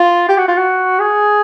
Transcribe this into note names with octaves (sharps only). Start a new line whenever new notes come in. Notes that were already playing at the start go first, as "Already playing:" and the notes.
Already playing: F4
G4
F#4
F4
F#4
G#4